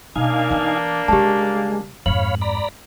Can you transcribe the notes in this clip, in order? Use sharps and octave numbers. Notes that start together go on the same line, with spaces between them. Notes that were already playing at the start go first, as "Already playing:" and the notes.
B2 A#3 D4 D#4 F5 G#5
E3 B3
C#3 G3 G#3 G4 A5
F2 G#2 C#5 F5 B5 F#7
D5 A#5 B5